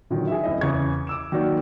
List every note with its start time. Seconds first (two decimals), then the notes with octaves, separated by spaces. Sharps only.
0.10 A#2 D3 D#3 F#3
0.27 G#4 E5
0.44 D1 F#2 A2 D#5
0.61 E2 C#3 C#6 G#6
1.07 D6 E6 E7
1.32 D#3 F#3 A#3 F#4 D5